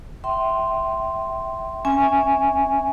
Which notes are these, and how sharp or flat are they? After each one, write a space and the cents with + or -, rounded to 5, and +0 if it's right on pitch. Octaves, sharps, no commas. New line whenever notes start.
E5 +0 G5 -30 C6 +0
C#4 +0 E5 -5 G#5 -5